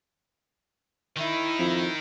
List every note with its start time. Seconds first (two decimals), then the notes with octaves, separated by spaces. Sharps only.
1.17 D#3 D#4 E4
1.58 F2